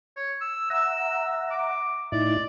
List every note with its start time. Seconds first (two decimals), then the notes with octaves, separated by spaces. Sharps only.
0.17 C#5
0.41 E6
0.70 E5 F#5 A#5 E6
1.51 D6
2.12 A2 D#4 E4 D5